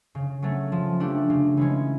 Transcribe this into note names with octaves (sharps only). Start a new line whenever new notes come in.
C#3
F#3 A3 C#4
F3
A3 D4 G4
C#3
E3 G#3 C#4